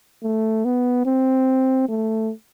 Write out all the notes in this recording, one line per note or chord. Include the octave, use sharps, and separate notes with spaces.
A3
B3
C4
A3